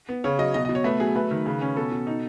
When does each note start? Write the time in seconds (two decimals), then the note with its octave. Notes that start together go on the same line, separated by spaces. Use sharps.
0.09 B3
0.24 C#3 C#5
0.39 F#3 D#5
0.54 B2 D#5
0.65 B2 D#5
0.75 C#5
0.84 A3 B4
1.00 F#3 G#4
1.16 A3 B4
1.31 D#3
1.46 C#3
1.61 C#4
1.76 B2 A4
1.91 B2
2.07 D#4